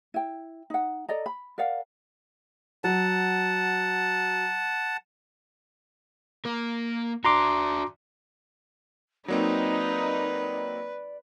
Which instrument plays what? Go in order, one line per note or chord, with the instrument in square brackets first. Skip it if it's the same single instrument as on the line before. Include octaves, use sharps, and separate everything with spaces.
[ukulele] E4 G5
D#4 F#5
A4 D5 D#5 A#5
B5
A#4 D5 F5 F#5
[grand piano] F#3 [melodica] F#5 A5
[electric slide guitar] A#3 A#4
[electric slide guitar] D4 F#4 [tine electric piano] A#5 C6 D6
[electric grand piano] F#3 A#3 C4 [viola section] D#4 [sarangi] B4 [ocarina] D5